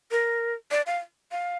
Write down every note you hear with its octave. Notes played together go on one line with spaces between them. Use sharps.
A#4
D5
F5
F5